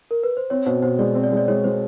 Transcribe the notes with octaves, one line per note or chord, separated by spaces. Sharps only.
A#4
B4
C5
C4 C#5
B2 C5
B2 C5
G#3 D5
C4
D5
G#3
D5
G#3 C#5
G#3 C5